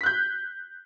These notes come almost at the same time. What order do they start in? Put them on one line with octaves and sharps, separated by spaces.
B6 F#6 G6